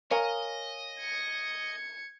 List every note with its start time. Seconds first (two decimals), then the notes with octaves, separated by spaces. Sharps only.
0.11 A#4 C#5 D#5 F5 G#5
0.99 G#6 C#7